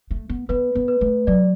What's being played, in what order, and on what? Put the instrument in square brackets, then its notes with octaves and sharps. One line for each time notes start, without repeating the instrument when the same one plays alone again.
[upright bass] A3
B3
[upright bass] B3 [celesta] B4
[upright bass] B3
[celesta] B4
[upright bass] A3
[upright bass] F#3 [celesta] D5